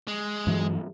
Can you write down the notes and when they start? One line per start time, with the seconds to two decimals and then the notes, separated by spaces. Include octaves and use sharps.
0.08 G#3
0.47 G2 E3 F#3